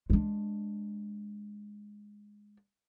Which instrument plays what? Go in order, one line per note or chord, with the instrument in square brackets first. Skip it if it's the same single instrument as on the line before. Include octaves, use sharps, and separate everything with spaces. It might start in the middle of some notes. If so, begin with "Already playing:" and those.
[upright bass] G#3 D4